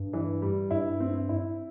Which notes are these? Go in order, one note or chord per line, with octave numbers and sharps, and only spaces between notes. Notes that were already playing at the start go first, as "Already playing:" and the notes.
Already playing: G2
E3
G3
G2 E4
C4
E4